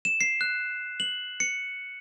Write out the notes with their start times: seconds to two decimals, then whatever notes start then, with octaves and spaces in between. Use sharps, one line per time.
0.05 E7
0.21 C7
0.41 F#6
1.00 F#7
1.40 C#7